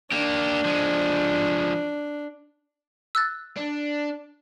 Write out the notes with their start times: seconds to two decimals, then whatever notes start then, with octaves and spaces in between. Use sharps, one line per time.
0.12 A#3 D4 G4
0.65 F3 G#3
3.15 E6 F#6 A6
3.57 D4